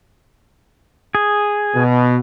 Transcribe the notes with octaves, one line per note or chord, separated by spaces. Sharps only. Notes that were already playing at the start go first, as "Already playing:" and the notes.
G#4
B2